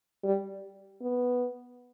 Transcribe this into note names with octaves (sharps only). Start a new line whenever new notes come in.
G3
B3